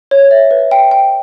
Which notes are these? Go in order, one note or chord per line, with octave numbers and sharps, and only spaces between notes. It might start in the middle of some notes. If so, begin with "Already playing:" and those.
C#5
E5
B4
G5
G5